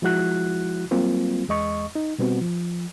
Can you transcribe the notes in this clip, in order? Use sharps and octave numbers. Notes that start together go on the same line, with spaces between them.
F3 G#3 E4 F#4 F#6
F#3 G3 A#3 C4 F4
E2 G#3 D#5 C#6
D#4
B2 G3 B3 C4 F#4
F3